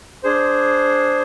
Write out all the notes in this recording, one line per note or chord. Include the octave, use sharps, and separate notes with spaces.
D4 G#4 C5